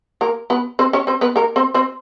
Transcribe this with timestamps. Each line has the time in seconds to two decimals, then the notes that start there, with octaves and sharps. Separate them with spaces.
0.21 A#3 A#4
0.50 B3 B4
0.79 C4 C5
0.93 C#4 C#5
1.07 C4 C5
1.21 B3 B4
1.36 A#3 A#4
1.56 C4 C5
1.74 C4 C5